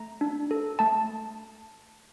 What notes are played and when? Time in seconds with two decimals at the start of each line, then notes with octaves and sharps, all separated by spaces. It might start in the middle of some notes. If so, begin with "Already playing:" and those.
Already playing: A3 A#5
0.21 D4
0.51 A4
0.79 A3 A5